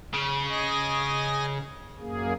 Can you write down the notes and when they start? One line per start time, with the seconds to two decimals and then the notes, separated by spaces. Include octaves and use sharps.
0.14 C#3
0.49 D#5 G#5 A#6
2.00 F#2 A#3 G#4